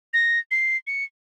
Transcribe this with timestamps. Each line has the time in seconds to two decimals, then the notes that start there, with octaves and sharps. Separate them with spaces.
0.14 A#6
0.51 C7
0.87 C#7